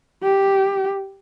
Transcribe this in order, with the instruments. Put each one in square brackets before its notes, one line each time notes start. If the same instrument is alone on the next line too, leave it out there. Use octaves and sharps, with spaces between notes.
[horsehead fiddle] G4